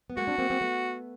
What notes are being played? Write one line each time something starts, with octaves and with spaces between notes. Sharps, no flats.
B3
G#3 A#3 F#4
C4 D4
A#3 C4
A#3 C4
A3 B3